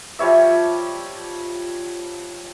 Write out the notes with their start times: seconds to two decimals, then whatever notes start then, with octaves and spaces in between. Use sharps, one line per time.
0.19 F3 G3 C#5 E5